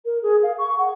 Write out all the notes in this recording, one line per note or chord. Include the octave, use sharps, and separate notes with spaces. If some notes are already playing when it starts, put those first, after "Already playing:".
A#4
G#4
F5
C#6
F#5